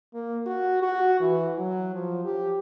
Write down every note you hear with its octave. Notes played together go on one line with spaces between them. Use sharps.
A#3
F#4
F#4
E3
F#3
F3
G4